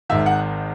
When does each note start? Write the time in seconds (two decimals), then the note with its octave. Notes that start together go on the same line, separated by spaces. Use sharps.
0.09 G#1 G#2 D#3 E5
0.26 F#5